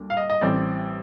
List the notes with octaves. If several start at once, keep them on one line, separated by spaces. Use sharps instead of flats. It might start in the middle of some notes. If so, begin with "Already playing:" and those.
Already playing: D2 D3 G3 A#3 D4
F5
D#5
D#5
A1 A2 G3 C4 D5